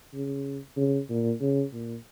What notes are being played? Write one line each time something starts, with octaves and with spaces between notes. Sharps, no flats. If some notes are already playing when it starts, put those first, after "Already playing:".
C#3
C#3
A#2
C#3
A#2